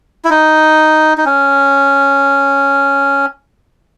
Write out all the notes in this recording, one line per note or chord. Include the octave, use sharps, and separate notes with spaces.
E4
D#4
D#4
C#4